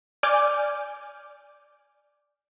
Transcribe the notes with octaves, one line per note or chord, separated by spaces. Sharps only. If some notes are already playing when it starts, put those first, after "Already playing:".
D5 G#5 D6 F6 G6